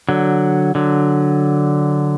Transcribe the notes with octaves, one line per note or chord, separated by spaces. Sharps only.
D3 F#3
D3 F#3